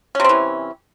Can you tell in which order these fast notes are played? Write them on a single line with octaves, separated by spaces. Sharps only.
C#4 C3 C4 E3